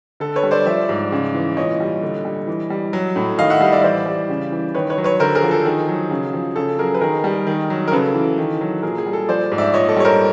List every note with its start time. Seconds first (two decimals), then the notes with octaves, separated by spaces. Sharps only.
0.20 D3 A4
0.36 B4 C#5
0.43 G3
0.51 C5 D5
0.66 F3 D5 E5
0.89 G#2
1.12 C#3
1.35 E3
1.57 A#2 C#5 D#5
1.80 G3
2.03 D3
2.25 G3
2.47 E3
2.70 G3
2.93 F#3
3.16 A2
3.38 D#3 D#5 F5
3.50 E5 F#5
3.61 G3 D#5 F5
3.72 D5 E5
3.83 E3 C5 D5
4.06 G3
4.29 C#3
4.52 E3
4.74 D#3 B4 C#5
4.90 B4 C#5
4.98 F#3
5.04 B4 C#5
5.19 D3 A#4 C5
5.35 G#4 A#4
5.43 F3
5.51 A4
5.65 D#3 G#4
5.88 F#3
6.11 C#3
6.34 F3
6.56 C#3 A4
6.78 F#3 G#4 A#4
6.95 B4
7.01 D#3 G#4 A#4
7.24 G3
7.47 D#3
7.70 F#3
7.88 A#4
7.92 C#3 A4 B4
8.14 E3
8.38 D#3
8.61 F#3
8.82 A#2 G#4 A#4
8.98 G#4
9.06 G3
9.13 A4
9.29 F3 C5 D5
9.52 G#2
9.58 D5 E5
9.74 A#2 C#5 D#5
9.89 A4
9.96 G3 C#5
10.04 A#4 C5